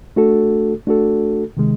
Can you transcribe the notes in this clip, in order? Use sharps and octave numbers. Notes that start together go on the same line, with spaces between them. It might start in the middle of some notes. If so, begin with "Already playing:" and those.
A3 D4 F#4 A4
A3 D4 F#4 A4
C3 D#3 G#3